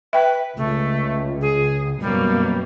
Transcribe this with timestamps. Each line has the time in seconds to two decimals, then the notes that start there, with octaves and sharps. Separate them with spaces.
0.13 B4 E5 G5
0.57 C#2 A3
1.41 G#4
2.00 F#2 B2 G3 A#3